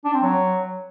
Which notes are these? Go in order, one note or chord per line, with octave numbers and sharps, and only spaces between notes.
D4
C4
F#3